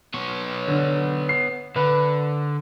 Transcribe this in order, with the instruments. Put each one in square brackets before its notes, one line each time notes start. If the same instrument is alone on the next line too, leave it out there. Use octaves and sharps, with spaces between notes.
[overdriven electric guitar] B3 C#5
[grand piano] D3
C7
[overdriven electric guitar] D3 [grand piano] B4